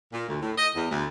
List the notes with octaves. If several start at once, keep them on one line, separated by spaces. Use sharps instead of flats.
A#2
D2
A2
D#5
E2
D2